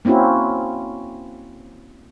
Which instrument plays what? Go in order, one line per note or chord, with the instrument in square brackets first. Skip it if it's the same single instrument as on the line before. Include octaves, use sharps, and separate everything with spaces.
[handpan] A#3 C4 C#4 E4 F#4